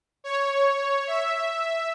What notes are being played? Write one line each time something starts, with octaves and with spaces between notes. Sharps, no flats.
C#5
E5